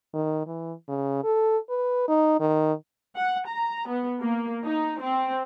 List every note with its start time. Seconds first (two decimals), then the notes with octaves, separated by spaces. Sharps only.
0.14 D#3
0.47 E3
0.88 C#3
1.24 A4
1.70 B4
2.08 D#4
2.40 D#3
3.16 F#5
3.47 A#5
3.87 B3
4.20 A#3
4.64 D#4
5.01 C4